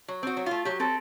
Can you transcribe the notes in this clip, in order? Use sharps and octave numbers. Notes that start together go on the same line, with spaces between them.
F#3
C4 F#4
F#3
A3 F4
F#3 G4
C4 A4